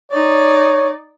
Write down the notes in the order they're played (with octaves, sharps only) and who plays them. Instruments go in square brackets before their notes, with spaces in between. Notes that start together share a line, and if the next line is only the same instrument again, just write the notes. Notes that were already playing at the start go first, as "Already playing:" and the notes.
[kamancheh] D#4 D5 [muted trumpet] C#5